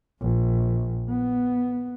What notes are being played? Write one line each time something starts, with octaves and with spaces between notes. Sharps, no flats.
A#1
B3